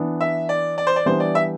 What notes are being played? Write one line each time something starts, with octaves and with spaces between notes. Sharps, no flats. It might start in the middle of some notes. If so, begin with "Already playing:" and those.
Already playing: E3 B3 D4
E5
D5
D5
C5
D5
E3 G3 B3 D4 G4 C5
D5
E5